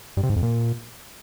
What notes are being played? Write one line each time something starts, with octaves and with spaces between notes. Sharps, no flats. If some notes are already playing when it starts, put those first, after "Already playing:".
G2
C3
G#2
F2
A#2